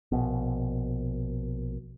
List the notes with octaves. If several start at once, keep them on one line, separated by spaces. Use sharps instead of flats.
A#1 B2